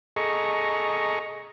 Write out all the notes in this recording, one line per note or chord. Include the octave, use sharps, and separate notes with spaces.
G#4 A4 D#5 A#5 C#6